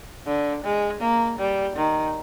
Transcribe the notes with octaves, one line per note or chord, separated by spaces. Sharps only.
D3
G#3
A#3
G3
D#3